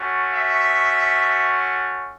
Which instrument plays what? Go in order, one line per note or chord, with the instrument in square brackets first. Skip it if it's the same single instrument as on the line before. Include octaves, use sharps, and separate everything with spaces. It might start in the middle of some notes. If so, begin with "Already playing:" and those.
Already playing: [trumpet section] A3 C#4 F#4
E5